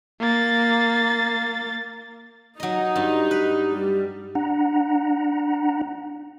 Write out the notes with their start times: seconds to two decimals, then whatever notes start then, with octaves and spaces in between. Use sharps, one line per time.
0.21 A#3 A6
2.60 F#3 D#4 D#5
2.96 G2
3.31 B4
3.71 G3
4.35 D4 F#5 A#5